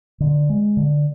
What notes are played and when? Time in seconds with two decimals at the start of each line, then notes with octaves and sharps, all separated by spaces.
0.20 D3
0.49 G#3
0.77 D3